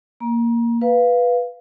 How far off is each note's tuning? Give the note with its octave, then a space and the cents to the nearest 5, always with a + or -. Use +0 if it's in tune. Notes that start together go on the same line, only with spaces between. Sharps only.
A#3 +0 A#5 +30
B4 -5 F5 +0